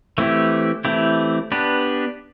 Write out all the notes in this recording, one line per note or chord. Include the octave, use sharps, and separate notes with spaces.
E3 A3 C4 E4 G4
E3 A3 C4 E4 G4
B3 D4 G4 B4